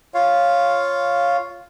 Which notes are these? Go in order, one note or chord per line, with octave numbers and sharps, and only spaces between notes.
F4 C#5 F5